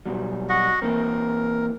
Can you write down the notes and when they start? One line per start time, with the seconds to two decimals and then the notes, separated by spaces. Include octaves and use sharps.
0.06 B2 F#3 G3
0.49 F#4 D#5 F#5
0.82 E3 A#3 C4 A#4